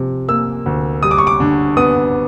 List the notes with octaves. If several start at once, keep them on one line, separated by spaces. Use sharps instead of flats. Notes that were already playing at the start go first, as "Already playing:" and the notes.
Already playing: C3 F3
A#3 E6
D2
G3 D#6
D6
C#6
D6
D3
B3 D#6